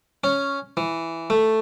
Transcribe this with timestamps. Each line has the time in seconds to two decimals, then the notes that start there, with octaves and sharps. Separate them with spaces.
0.24 C#4
0.77 E3
1.30 A3